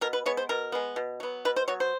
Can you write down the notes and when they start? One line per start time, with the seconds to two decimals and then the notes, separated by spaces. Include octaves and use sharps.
0.01 B2 A#4
0.13 B4
0.26 G#3 B3 C#5
0.37 C5
0.49 B2 A#4
0.72 G#3 B3
0.96 B2
1.20 F#3 B3
1.45 B2 B4
1.56 C5
1.68 F#3 B3 C#5
1.80 C5